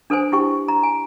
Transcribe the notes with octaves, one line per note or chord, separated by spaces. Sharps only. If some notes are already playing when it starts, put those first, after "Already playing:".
D4 A4 B4 C5 G#5
E4 G4 G5 C#6
A#5
G#5